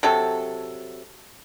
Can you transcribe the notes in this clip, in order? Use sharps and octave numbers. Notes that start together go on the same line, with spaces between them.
C3 F#3 A4